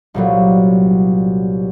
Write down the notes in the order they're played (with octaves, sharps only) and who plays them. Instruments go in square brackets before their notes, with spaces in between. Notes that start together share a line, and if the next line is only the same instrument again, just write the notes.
[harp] C2 A#2 F#3